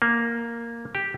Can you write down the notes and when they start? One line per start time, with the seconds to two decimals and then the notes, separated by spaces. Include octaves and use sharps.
0.02 A#3
0.95 G4